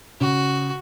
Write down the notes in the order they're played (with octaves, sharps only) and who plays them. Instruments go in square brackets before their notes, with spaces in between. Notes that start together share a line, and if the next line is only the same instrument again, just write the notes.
[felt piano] C#3 [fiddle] F#4